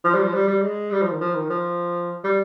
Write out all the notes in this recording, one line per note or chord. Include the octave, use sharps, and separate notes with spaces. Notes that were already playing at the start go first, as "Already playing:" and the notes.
F3
G3
F3
G3
G3
G#3
G3
F3
D#3
F3
D#3
F3
G3